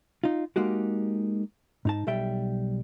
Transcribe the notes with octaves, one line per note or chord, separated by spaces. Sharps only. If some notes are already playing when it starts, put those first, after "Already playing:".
D#4 F4
G#3 A#3 D#4 F#4 G4
G#2 D#4 A5
B1 G3 E5 G5